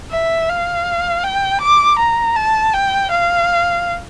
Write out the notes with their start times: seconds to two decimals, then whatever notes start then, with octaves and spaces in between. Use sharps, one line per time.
0.11 E5
0.49 F5
1.24 G5
1.61 D6
1.99 A#5
2.36 A5
2.73 G5
3.11 F5